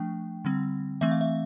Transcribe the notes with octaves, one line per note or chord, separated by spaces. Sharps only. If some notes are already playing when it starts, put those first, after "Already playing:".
Already playing: F3 A3 D4 G5
D3 G3 C4
E3 A3 C4 E5
F5
E5